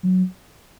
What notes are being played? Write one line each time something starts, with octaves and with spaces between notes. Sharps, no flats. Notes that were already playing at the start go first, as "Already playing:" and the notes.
F#3